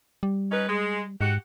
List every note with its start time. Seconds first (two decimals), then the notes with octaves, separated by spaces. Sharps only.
0.23 G3
0.52 C#4 D#4 B4
0.69 G#3
1.21 G#2 F#4 G4 F#5